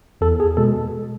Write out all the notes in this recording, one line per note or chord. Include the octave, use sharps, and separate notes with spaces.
E2 A4
G#4
B2 G#3 A4